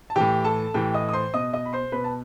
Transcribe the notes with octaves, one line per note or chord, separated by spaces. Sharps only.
A5
A2 E3 G4 G5
A4 A5
A2 E3 G4 G5
D#5 D#6
D#6
C5 C6
B2 D#5 D#6
D#5 D#6
B5
C5 C6
B2 B4 B5
A5